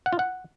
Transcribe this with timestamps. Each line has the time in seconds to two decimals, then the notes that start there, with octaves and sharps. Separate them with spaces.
0.06 F#5
0.13 F4
0.19 F#5